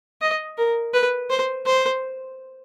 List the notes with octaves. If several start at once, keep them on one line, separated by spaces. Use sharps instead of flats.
D#5
A#4
B4
C5
C5